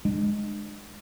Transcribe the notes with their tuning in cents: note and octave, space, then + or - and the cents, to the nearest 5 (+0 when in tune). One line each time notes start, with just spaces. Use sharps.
G#3 +0 D4 +35